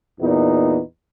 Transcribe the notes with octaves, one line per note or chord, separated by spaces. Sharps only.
E2 A#2 B3 D#4